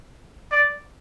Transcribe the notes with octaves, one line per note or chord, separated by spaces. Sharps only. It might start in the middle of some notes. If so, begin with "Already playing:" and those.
D5